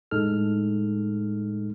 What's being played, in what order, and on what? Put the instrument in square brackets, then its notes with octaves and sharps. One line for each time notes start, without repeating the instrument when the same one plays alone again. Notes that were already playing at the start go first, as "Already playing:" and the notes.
[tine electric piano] A2 G#3 D#4 A4 F6